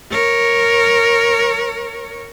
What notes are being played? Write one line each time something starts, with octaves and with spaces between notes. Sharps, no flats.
A#4 C#5